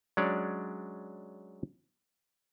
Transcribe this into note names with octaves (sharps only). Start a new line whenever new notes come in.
F#3 G#3 C#4 D4 C#5 D5